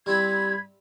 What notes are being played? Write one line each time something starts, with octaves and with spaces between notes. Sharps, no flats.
G3 C4 E4 B5 G#6